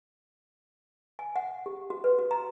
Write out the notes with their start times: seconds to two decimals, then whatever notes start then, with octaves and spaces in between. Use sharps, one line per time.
1.19 G#5
1.36 F#5
1.66 G4
1.90 F#4
2.04 B4
2.19 F#4
2.31 A#5